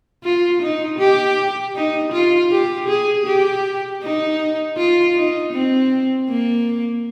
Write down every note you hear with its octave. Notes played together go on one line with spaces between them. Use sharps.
F4
D#4
G4
D#4
F4
G4
G#4
G4
D#4
F4
D#4
C4
A#3